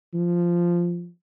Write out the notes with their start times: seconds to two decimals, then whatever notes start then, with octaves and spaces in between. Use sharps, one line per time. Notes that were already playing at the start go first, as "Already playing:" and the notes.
0.14 F3